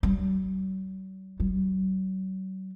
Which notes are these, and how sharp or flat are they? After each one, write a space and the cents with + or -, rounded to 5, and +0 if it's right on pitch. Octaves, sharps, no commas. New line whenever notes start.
F#3 +45
F#3 +40